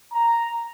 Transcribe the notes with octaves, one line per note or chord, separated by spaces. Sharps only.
A#5